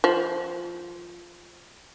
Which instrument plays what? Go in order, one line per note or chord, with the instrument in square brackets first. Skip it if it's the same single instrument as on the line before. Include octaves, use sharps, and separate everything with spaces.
[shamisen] F3